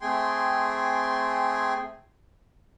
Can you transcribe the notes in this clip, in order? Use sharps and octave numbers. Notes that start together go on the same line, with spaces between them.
A3 C4 G#4 G5 G#5 C6